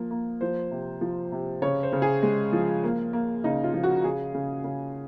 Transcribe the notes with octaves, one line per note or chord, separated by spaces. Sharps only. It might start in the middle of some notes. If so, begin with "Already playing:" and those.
Already playing: F3 A#3
A#3
F3 C5
C3
F3
C3
C#3 C#5
C5
C#3
G#4
G#3
F3
A#3
A#3
C#3 D#4
F4
F3
F#4
C#3 G#4
C#3
C#3